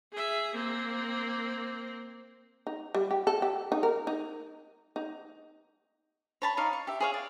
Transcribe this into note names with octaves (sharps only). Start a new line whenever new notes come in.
G#4 E5
A#3 C4
D#4
G3
G4
A4
G4
D#4
A#4
D#4
D#4
C#5 A5 B5
D#4 C#5 D5 F5
C#6
G4 E5
G#4 C#5 F5
D5